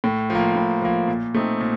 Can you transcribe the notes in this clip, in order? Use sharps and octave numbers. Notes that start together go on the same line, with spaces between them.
A2
F3 A#3
A2
F3 A#3
A#2
A3 C4 D#4
A#2